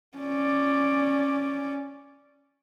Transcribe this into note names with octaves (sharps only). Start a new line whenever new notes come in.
C#4 D5